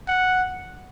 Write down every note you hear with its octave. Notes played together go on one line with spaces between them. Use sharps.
F#5